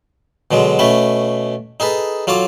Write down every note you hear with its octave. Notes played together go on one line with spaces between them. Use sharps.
B2 D3 F#3 G#3
B2 A3 C#4 B4
D#4 G#4 A4 B4
F#3 F4 A4 C#5 D6